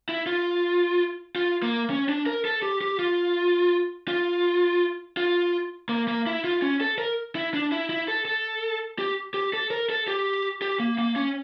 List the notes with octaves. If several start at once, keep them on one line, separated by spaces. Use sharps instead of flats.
E4
F4
F4
A#3
C#4
D4
A#4
A4
G4
G4
F4
F4
F4
A#3
A#3
E4
F4
C#4
A4
A#4
E4
D4
E4
E4
A4
A4
G4
G4
A4
A#4
A4
G4
G4
A#3
A#3
C#4